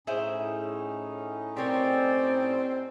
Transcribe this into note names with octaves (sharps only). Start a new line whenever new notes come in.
A2 C#4 D#4 E4 G#4 C5
C4 G4 A#4 C#5 D5